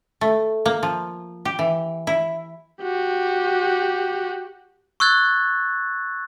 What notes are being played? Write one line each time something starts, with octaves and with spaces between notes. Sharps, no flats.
A3
A#3
F3
G4
E3
E4
F#4 G4
C#6 E6 F#6 G#6 A6